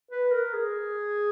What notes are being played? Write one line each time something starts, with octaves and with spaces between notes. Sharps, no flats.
B4
A#4
G#4